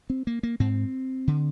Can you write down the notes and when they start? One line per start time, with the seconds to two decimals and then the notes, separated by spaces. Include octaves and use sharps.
0.10 C4
0.27 A#3
0.43 A#3
0.60 G#2 C4
1.28 D3